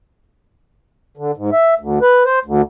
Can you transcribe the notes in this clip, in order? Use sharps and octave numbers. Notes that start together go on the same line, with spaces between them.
D3
G#2
E5
D2
B4
C5
D2